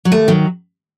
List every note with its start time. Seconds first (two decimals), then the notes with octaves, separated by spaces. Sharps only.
0.05 F#3
0.12 D#2 A3
0.28 D#3 F#3